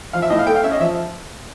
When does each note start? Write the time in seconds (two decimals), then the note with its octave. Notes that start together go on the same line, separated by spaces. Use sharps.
0.13 F3 F5
0.22 E5
0.30 A2 D#5
0.39 F5
0.47 A3 G5
0.55 F5
0.63 C#4 E5
0.72 D#5
0.80 F3 E5